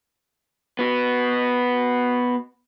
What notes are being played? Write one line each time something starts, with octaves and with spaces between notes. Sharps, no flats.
B3 F#4